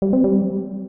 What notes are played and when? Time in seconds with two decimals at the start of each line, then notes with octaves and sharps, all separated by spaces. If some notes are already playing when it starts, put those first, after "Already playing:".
0.02 G3
0.13 C4
0.24 G3